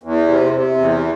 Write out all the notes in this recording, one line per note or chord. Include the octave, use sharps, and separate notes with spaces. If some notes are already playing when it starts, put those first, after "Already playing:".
E2
C3
C3
E2